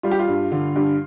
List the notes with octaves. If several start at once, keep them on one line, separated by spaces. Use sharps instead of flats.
G3 F4
G4
F4
G2
D3
G2